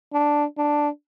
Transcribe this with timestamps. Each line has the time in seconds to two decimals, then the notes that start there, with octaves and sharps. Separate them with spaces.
0.13 D4
0.58 D4